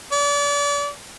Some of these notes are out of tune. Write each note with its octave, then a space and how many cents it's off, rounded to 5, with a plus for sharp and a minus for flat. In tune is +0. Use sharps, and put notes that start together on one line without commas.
D5 -35